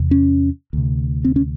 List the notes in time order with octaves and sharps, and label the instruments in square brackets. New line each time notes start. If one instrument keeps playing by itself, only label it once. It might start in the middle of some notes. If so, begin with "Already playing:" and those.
Already playing: [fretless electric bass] E2 C3
C#4
D2 C3
C4
C#4